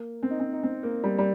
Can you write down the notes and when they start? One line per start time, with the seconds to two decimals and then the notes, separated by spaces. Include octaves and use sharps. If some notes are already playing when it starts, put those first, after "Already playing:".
Already playing: A#3
0.23 C4
0.31 D#4
0.40 C4
0.53 D#4
0.63 C4
0.83 A#3
1.04 G3
1.18 G3